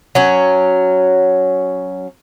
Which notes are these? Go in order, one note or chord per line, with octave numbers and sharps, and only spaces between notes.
F#3 C#4